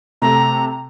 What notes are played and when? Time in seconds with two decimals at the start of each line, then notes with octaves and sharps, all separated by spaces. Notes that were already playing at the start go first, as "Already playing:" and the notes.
0.22 C3 A3 A#5